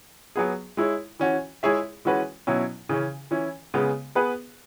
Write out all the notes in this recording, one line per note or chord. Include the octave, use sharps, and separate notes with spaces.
F#3 B3 G#4
G#3 E4 C#5
E3 C#4 F#4
G#3 E4 G#4 C#5 E5
E3 G#3 C#4 F#4 B4
B2 F#3 C#4 E4
C#3 E3 C#4
E3 C#4 E4
C#3 G#3 B3
B3 G#4 B4